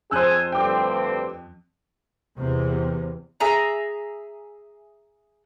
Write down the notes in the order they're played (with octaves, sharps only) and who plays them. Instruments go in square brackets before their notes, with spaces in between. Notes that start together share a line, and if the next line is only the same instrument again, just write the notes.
[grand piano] F2 F#6 [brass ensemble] G#4 G#5 [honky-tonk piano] C5 E6
[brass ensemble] D2 G2 C4 [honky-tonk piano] G5 D6
[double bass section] E2 C3
[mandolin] G#4 E5 A#5